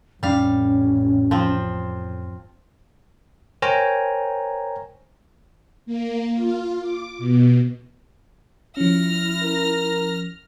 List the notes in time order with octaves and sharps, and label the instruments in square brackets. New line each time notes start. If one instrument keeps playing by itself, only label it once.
[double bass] A1 [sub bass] F2 [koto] G3 F5 [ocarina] C#4
[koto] F3 C4
[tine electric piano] A#4 C5 C#5 G5 G#5 A#5
[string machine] A#3
F4
D6
B2
[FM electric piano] F3 C#4 [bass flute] E4 [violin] F6 A#6
[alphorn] A#4